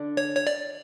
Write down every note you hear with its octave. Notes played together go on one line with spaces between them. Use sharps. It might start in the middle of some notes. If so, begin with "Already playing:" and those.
Already playing: D3 D4
C#5
C#5
D5